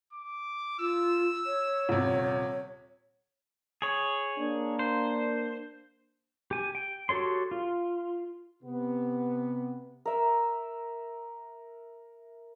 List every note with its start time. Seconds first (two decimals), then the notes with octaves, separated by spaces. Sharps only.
0.13 D6
0.80 F4 E6
1.46 C#5
1.89 D#1 C3
3.82 G#4 C#5
4.38 A#3 D4
4.79 C5
6.51 G4 G#5
6.75 G5
7.09 F#4 G4 A4 C#5 C6
7.51 F4
8.64 C3 B3
10.05 A#4 E5